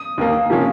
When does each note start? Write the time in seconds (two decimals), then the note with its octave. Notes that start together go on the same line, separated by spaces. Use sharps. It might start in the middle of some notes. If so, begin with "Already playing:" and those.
Already playing: D#6
0.18 D#2 D#3 A#3
0.50 C3 F3 A#3 C#4